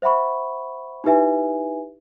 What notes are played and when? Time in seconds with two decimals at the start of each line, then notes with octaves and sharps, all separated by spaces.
0.02 C5 E5 F#5 B5 C#6
1.04 D#4 E4 G4 B4 E5 G#5